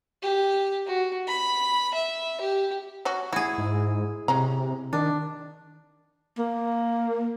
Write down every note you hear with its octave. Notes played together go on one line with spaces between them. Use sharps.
G4
F#4
B5
E5
G4
F#3 C#4 F#4
E4 F#4 G#4
G#2
C3 G#3 C#4 A#5
D#3 D4
A#3